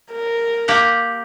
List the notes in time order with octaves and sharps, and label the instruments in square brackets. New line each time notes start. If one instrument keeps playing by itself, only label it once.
[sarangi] A#4
[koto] A#3 G4 F#5